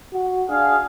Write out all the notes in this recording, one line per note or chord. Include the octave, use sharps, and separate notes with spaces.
F#4
D4 G#4 F5